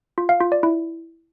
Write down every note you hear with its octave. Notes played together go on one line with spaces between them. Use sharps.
F4
F5
F4
D5
E4